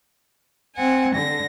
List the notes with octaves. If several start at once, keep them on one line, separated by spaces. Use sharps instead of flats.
C4 F#5 G#5
D3 A#6